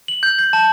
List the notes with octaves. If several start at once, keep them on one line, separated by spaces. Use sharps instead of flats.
F#7
G6
G6
A5